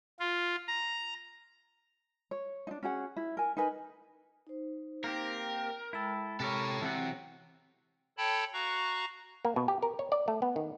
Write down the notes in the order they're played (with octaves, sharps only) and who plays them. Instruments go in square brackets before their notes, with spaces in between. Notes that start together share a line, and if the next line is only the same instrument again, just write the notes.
[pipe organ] F4
A#5
[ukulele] C#5
D4 D#4
C#4 F#4 G#4 F#5
E4
A#4 G#5
D#4 A#4 B4 G#5
[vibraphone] D#4 C5
[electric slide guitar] A#3 C4 G4 [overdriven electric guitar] A#4
[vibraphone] G5
[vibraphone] G#3 G5 B5 [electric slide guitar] E4 A4
[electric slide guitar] C3 G4 A#4 [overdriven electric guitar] A4 C#5
[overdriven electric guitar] C3 [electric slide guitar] E3 F#3 F#5
[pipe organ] A4 C#5 G5 A5 B5
F#4 F5 A#5 C#6 F#6
[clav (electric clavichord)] A#3
B2
G4
A#4
C#5
D5
A3
B3
D#3